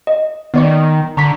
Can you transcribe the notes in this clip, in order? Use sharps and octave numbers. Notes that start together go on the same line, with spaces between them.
D#5
D#3 B3 D5 C#6
D3 A#5 C#6 B6